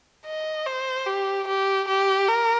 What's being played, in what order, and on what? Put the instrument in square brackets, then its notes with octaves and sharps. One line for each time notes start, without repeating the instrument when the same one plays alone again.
[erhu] D#5
C5
G4
G4
G4
A#4